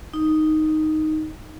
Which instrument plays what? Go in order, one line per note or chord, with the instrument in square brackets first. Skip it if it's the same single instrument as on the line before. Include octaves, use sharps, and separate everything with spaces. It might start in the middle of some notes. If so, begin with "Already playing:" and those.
[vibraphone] D#4